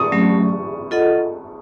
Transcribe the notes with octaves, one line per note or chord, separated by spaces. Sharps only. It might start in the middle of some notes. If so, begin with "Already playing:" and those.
Already playing: A5 C#6 D#6
F#3 A3 C#4
F4 A4 D#5 F#5